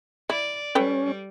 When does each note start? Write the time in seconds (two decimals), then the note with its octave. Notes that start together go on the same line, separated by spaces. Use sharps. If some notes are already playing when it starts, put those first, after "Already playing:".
0.30 E4 D5
0.75 G3 C#4 A4 B4 G5